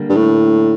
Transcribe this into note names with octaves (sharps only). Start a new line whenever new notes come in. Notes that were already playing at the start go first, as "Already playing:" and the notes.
Already playing: D3 G3 A#3
G2
A2